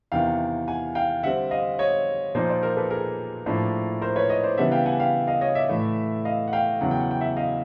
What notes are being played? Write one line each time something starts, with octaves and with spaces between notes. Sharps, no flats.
E2 C3 D#3 F5 G5
F#5 G#5
F5 G5
D3 G3 C4 E5 F#5
D#5 F5
C#5 D#5
A#2 F3 A#3 D#4 C5 D5
C5 D5
A#4 C5
A4 B4
G#4 A#4
A2 F3 A#3 D4
A#4 C5
B4 C#5
C#5 D#5
C5 D5
C#3 E3 G3 B3 D4 E5 F#5
F5 G5
F#5 G#5
F5 G5
D#5 F5
C#5 D#5
D5 E5
A2 E3 A3
D#5 F5
F#5
F5 G5
E2 C#3 F#3 F#5
G5
F#5
G5
E5 F#5
D#5 F5